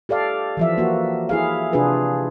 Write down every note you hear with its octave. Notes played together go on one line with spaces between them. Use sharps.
G4 A4 D5 F5
E3 F3 E5
A#3 F#4
E4 G#4 F5
C3 D4 F4 G#4 B4